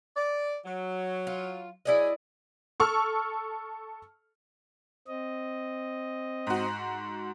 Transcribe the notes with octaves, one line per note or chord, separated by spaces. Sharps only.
D5
F#3
F4
F#3 E4 G#4 D5 D#5
A4 C#6 E6 F6
C4 D#5
G#2 F#4